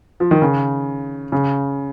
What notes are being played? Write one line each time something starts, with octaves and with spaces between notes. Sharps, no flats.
F3
D#3
C#3
C#3